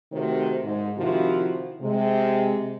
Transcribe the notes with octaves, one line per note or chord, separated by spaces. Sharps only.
C3 D#3 A3 F#4 C5
G#2
C3 D#3 F3 E4 F#4
C3 G#3